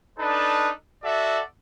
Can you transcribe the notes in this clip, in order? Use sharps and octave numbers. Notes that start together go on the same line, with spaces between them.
D4 D#4 A4 B4
F#4 A4 D5 E5